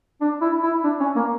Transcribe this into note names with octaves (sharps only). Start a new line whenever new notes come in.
D4
E4
E4
D4
C#4
A#3